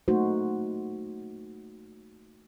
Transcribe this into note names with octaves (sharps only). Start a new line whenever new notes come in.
A3 A#3 D#4 F#4 C5